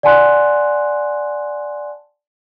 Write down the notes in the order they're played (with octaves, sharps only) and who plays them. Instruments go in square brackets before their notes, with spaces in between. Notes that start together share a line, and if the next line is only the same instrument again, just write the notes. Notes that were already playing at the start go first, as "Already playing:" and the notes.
[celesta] D5 F#5 G#5 A5 C6 F#6